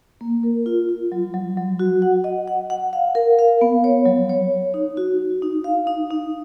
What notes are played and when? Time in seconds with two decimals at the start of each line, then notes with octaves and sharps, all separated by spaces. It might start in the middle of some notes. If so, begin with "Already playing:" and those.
0.21 A#3
0.43 A#4
0.66 F4
0.89 F4
1.12 F#3
1.34 F#3
1.57 F#3
1.79 F#4
2.02 F#5
2.24 D#5
2.48 F#5
2.70 F#5
2.93 F5
3.15 A#4
3.39 F5
3.61 B3
3.84 C#5
4.06 F#3
4.29 C#5
4.52 C#5
4.74 D#4
4.97 F#4
5.19 F#4
5.42 D#4
5.64 F5
5.87 D#4
6.10 D#4